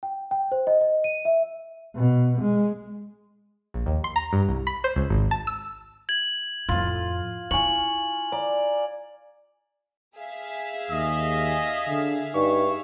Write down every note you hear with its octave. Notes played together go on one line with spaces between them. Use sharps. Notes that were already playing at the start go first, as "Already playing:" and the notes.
G5
G5
C5
D#5
D#5
D#7
E5
B2
G#3
A#1
D#2
C6
A#5
G2
C2
B5
C5
C#2
G#1
A5
E6
G#6 F#7
F2 A2 F4
D#4 E4 G#5 C#6 F#7
D5 A#5
G#4 E5 F5
D#2 D#5
D3
G2 D#4 C#6